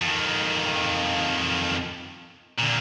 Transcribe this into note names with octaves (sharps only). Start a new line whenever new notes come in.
F2 D#3
A#2 D3